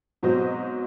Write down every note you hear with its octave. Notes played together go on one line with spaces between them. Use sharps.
G#2 B2 F#3 C4 C5 D#5